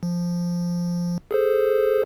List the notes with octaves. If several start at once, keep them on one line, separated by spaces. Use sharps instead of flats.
F3
G#4 A4 C5